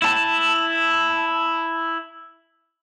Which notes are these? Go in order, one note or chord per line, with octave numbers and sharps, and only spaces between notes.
E4 A5